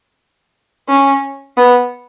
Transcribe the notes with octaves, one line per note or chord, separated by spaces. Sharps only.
C#4
B3